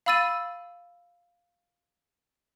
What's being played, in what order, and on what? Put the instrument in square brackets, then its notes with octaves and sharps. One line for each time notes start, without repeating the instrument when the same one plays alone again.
[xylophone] F5 B5 E6 A6 D#7